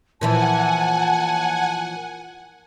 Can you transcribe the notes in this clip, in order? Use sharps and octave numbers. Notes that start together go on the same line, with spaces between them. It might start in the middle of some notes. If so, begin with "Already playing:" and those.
A#2 E3 F3 F#5 G#5 A5